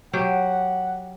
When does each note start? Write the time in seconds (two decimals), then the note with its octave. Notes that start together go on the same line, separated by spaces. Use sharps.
0.13 F#3 G4 F#5